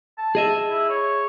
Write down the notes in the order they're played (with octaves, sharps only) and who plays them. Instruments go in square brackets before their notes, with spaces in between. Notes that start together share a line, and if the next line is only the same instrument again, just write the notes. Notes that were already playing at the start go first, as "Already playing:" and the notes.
[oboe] A5
[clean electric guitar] G#4 D#5 E5
[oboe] E4
C#5